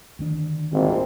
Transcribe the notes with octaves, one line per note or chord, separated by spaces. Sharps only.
D2 D#3 D4
G#1 A#2 G3 C4